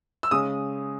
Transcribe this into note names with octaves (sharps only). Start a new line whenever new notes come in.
E6
C#3 G#3 C#4 D#6